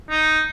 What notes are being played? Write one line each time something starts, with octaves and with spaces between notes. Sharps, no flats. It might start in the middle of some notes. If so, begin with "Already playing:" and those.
D#4